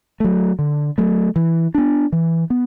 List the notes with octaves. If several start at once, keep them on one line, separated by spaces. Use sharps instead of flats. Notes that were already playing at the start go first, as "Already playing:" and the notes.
F#3 A3
D3
F#3 A3
E3
B3 D4
E3
B3